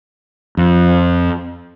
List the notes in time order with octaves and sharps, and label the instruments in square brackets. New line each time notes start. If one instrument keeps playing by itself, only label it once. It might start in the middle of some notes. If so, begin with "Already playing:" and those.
[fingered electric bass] F2